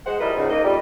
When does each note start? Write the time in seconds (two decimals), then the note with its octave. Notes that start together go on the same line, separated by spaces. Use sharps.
0.06 G#3 C5 F#5
0.20 F3 G3 E4 A#4 B4 D#5
0.37 C#2 G#2
0.50 A#3 D#4 D#5
0.64 F2 G3